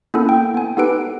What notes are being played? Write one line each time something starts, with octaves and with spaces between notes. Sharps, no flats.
A#3 B3 C#4 E4 A4
G5
B3 G#5
B3 D#4 G4 A4 B4 D7